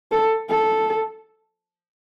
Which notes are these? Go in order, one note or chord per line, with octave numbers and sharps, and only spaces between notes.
A4
A4